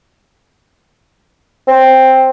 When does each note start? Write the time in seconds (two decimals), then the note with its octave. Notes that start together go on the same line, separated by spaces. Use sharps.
1.68 C4